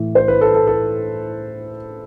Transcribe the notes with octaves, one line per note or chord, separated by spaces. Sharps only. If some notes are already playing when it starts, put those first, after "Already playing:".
Already playing: A2 E3
C5
B4
A4
A4
A4